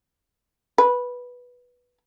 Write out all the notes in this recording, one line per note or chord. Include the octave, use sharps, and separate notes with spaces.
B4